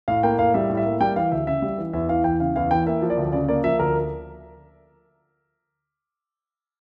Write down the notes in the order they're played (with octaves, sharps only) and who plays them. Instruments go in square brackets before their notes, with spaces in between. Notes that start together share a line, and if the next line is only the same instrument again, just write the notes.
[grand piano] A2 F5
A#3 G5
A2 F5
G3 E5
A2
E5
A#3
G3 G5
E3 F5
D2 E5
C#3 E5
G3
E3
E2 E5
E3 F5
E2 G5
C#3 F5
E2 F5
E3 G5
A#3 E5
F3
D5
D2
C#3 D5
A#3 D5
F3 E5
D2 A#4